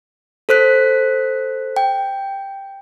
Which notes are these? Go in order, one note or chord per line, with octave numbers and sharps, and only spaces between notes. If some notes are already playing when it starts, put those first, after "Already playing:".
A4 C5 F#6 B6
G5